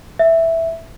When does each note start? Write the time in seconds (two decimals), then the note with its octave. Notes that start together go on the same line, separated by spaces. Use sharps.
0.19 E5